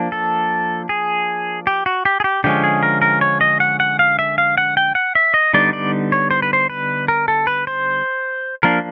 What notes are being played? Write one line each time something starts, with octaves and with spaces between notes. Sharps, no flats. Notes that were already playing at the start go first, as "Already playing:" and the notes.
Already playing: F3 A#3 D4
A4
G#4
G4
F#4
G4
G#4
G4
D3 F3 G#3 C#4 G4
G#4
A#4
A#4
C#5
D#5
F#5
F#5
F5
E5
F5
F#5
G5
F#5
E5
D#5
D3 G3 B3 D#4 D5
D5
C#5
C5
B4
C5
B4
A#4
A4
B4
C5
F3 A#3 D4 A#4